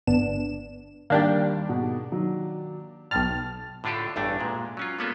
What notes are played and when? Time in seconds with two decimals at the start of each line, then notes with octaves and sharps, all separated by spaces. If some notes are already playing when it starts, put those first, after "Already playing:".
0.07 G1 B3 D4 E7
1.10 D#2 G3 A#3 D4 G4
1.69 G#2 B2
2.12 D#3 F#3
3.11 B1 G5 A5 F6 A6
3.84 A2 D3 D4 F4 G4 A4
4.16 A1 E2 G2 A3 D4
4.39 A#2 G#3
4.77 F#3 C#4 F4
4.99 G#3 A#3 B3 C#4 F4 A4